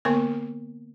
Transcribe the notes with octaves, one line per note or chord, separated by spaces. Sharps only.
D3 A#3 B3 A#4 C#6